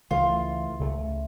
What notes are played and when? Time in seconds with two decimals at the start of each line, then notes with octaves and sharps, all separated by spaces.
0.10 C#2 C#3 E3 A3 F4
0.79 C#2 C#3 E3 A3